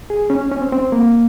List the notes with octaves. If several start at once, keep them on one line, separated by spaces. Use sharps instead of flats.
G#4
C#4
C#4
C#4
C4
C4
A#3